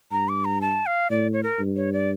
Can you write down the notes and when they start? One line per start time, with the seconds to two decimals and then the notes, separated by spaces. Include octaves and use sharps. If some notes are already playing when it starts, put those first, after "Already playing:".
0.11 G2 A#5
0.29 D6
0.45 A#5
0.61 A5
0.86 F5
1.10 A2 D5
1.33 C#5
1.43 A#4
1.60 G2
1.76 C#5
1.93 D5